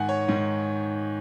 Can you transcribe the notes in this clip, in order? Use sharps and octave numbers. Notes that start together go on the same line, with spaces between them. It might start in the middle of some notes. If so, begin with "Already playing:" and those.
Already playing: G#2 D#3 F#5 G#5
C#5
G#2 D#3